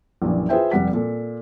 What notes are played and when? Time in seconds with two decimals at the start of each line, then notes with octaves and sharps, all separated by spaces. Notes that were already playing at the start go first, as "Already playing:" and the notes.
0.22 A#1 F#2 A#2 E3
0.49 F4 G#4 B4 C5 E5 G5
0.72 F1 G3 F#5 B6
0.93 A#2 A4